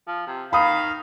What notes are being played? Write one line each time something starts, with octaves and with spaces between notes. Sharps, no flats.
F3
C3
D#3 F5 B5 D#6